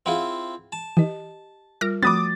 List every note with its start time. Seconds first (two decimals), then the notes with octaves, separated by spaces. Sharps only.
0.06 C4 E4 F4 G#4 F5 F#5
0.72 A5
0.97 E3 G4 D#5
1.81 G3 F4 A#4 F6 A#6 D7
2.03 F3 A3 C4 F#4 B5 D6 D#6 A6